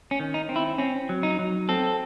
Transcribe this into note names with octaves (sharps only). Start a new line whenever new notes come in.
C#4
D#3
D#4
C4
E4
C4 C#4
F#3
D#4
F#3
C4 A4